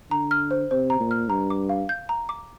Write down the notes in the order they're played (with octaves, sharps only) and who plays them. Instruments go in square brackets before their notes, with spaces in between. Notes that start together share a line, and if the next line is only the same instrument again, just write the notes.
[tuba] D3 [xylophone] A#5
[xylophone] F6
C5
[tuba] C3 [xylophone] C5
[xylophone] A#5
[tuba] A#2
[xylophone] F6
[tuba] G2 [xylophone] A#5
[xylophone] D6
F5
G6
A#5
D6